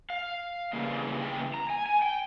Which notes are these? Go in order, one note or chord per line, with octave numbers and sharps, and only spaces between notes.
F5
C#3 E3 G3 A#3
G5
A#5
G#5
G#5
G5